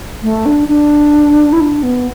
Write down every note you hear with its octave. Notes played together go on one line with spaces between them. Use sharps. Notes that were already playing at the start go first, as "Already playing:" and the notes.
A3
D4
D4
E4
D4
B3